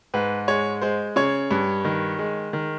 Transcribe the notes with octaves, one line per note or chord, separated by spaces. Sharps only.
G#2 B4
G#3 C#5
G#3 C5
C#3 C#5
G2
D#3
G#3
D#3